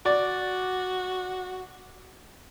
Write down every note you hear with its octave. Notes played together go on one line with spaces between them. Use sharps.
F#4 D5